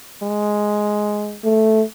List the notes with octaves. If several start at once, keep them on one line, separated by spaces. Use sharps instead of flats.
G#3
A3